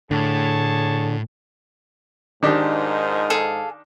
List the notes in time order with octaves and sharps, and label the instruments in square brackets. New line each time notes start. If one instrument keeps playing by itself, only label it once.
[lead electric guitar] A2 [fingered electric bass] D3 [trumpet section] G#4 C#5 A5
[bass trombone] G#2 [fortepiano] D#3 D4 G4 [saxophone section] F3 D#4 A#4
[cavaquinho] G#4 A4 F5